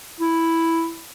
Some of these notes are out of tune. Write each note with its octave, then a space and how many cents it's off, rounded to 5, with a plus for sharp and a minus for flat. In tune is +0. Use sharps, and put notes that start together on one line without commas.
E4 +0